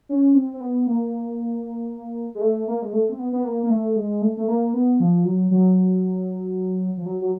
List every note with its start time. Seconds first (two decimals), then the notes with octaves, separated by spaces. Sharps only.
0.09 C#4
0.35 C4
0.54 C4
0.61 B3
0.87 A#3
2.35 G#3
2.41 A3
2.68 A#3
2.82 G#3
2.93 A3
3.09 C4
3.19 B3
3.33 B3
3.45 A#3
3.63 A#3
3.70 A3
3.96 G#3
4.22 A3
4.37 A3
4.48 A#3
4.74 B3
5.00 F3
5.25 F#3
5.51 F#3
6.97 F3
7.06 F#3
7.21 F#3